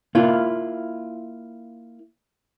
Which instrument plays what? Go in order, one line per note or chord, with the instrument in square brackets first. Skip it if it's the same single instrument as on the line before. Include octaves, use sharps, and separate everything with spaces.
[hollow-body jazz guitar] A#3 E4 F4